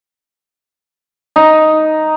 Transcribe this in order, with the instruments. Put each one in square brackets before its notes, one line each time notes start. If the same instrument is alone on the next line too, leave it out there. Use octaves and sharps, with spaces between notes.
[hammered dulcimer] D#4